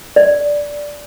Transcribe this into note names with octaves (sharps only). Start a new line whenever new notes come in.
D5